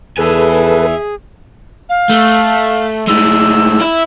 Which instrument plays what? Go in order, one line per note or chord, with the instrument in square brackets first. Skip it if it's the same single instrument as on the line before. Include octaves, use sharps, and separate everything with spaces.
[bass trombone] E2 [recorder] G#4 [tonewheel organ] A4 B4 [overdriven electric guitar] E5 G#5
[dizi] F5
[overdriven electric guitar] A3
[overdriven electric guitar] A2 G#3 [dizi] E6
[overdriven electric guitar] E4 E5